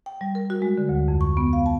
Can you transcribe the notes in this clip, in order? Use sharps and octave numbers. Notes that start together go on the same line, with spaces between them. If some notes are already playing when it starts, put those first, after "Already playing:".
G5
G3
A#4
F#4
G#3
D3
D2
F2
C#6
B3
F5
A5